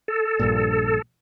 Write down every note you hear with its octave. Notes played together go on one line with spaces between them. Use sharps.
A4
A#1 G2 A#2